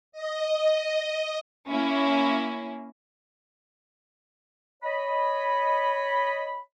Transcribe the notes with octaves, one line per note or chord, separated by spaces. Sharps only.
D#5
A#3 C#4 E4
C#5 D#5 B5